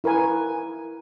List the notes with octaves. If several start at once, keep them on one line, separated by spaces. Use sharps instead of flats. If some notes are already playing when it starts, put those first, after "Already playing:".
E4 A#4 B4 G#5